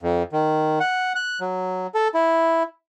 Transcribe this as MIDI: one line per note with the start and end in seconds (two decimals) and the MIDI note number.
0.02 0.23 41
0.33 0.79 51
0.80 1.13 78
1.15 1.39 90
1.41 1.87 54
1.95 2.08 69
2.14 2.63 64